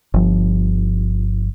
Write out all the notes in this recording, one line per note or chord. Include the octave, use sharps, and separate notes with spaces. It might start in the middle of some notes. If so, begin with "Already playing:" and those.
G1 F3